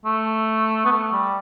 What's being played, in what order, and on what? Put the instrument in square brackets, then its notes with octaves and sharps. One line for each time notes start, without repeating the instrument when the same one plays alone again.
[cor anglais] A3
B3
A3
G3